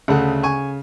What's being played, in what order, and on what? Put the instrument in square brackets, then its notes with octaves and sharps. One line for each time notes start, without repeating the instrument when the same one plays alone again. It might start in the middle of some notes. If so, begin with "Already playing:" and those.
[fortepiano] D2 A3 F#5 [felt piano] C#3
[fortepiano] G#5 C#6